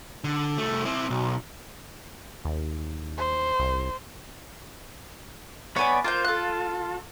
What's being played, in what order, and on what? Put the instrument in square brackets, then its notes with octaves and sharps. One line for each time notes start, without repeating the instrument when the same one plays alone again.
[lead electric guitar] D3
C2 A3
C4 E4
B1
[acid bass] D#2
[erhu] C5
[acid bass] C2
[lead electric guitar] B3 C#5 [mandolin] D5 G#5 B5
[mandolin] A#3 C5 G6 [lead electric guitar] F4
[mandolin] A4 F#6